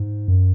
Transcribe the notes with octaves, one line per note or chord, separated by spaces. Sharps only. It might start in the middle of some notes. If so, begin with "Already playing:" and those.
Already playing: G#2
F#2